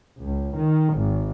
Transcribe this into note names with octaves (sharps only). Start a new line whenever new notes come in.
C#2
D#3
G#1